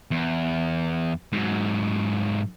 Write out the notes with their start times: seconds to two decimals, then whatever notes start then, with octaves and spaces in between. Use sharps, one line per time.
0.11 E2
1.32 G#2 F#3